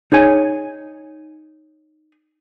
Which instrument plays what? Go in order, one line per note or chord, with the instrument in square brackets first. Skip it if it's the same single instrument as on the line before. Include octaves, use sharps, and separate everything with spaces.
[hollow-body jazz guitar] D#4 G#4 C#5 G#5